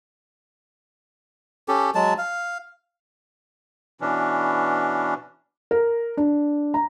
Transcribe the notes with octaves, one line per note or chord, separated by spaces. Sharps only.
C#4 G4 A4
F#3 G#3 A5
F5
B2 E3 C#4 D4
A#4
D4
A#5